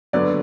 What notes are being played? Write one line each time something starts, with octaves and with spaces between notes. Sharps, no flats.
D3 F#3 B3 D5